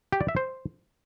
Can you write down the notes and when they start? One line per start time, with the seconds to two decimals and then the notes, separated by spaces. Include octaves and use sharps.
0.12 G4
0.20 D5
0.28 E5
0.36 C5